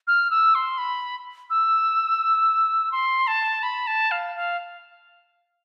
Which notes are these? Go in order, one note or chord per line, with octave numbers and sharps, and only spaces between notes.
F6
E6
C6
B5
E6
C6
A5
B5
A5
F5
F5